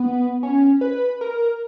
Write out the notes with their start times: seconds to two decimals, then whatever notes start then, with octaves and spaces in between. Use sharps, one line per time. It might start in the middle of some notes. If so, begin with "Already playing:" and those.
Already playing: B3
0.43 C#4
0.81 B4
1.21 A#4